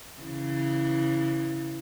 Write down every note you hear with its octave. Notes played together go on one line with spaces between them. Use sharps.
C#3 E3